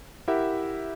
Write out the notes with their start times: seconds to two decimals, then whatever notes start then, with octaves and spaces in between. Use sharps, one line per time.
0.28 E4 G4 A#4 E5 F#5